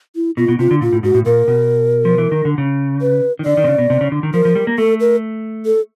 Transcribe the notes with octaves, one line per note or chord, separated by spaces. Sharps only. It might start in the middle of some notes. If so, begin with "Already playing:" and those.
E4
B2 F4
B2
C3 F4
D3
A#2 F4
A2
G#2 F#4
A2
A#2 A#4
B2
F3
E3
D#3
D3
C#3
B4
D#3
D3 D5
D#3
C3
C#3
B2
C3
C#3
D3
D#3
F3 A#4
F3
G3
A#3
A3 A4
A#4
A4